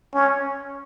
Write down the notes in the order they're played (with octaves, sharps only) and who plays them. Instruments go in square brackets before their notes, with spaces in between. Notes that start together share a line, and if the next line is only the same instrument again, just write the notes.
[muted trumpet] C#4